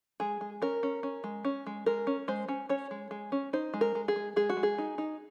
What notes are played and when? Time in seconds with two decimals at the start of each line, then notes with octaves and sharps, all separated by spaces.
0.20 G#3 G#4
0.41 G#3
0.62 C#4 A#4
0.83 C#4
1.03 C#4
1.24 G#3
1.45 C#4
1.67 G#3
1.86 G#3 A#4
2.07 C#4
2.28 G#3 C5
2.48 C#4
2.69 C#4 C#5
2.91 G#3
3.11 G#3
3.32 C#4
3.53 D#4 C5
3.74 G#3
3.81 A#4
3.95 G#3
4.08 G#4
4.16 G#3
4.36 G#3 G#4
4.49 F#4
4.57 G#3
4.63 G#4
4.78 D#4
4.98 D#4